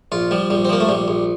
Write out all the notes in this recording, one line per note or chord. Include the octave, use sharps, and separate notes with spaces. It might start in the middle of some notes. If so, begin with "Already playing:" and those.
A#1 F4
F3 G3
A#1 G3
C4
F3 A#3
A3
A#1 G3
A#1